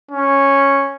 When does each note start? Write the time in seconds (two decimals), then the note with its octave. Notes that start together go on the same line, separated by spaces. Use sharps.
0.11 C#4